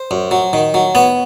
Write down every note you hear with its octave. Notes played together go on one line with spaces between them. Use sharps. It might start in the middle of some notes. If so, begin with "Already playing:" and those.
Already playing: C5
F#2
F#3
D#3
F#3
B3 C#5